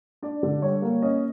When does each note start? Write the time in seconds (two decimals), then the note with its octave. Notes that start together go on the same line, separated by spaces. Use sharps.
0.22 D4 D5
0.43 D3
0.62 G3 C#5
0.82 A#3
1.02 C#4 D#5